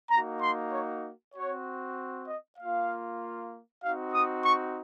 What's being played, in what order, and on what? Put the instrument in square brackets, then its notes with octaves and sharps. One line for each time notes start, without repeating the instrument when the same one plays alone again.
[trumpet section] A#3 D#4 F#4 A#5
C6
C#5
C4 F#4 C#5
D#5
A#3 F4 F5
C4 D#4 F#4 F5
D#6
C#6